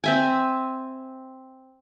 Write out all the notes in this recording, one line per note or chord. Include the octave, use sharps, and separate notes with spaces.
C4 E5 G#5